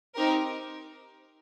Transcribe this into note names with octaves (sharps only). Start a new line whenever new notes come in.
C4 D#4 G4 A#4